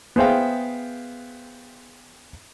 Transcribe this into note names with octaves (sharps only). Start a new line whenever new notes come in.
B3 G#4 C5 E5 F5 G5